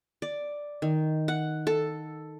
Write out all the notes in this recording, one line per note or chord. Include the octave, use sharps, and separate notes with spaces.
D5
D#3
F#5
A4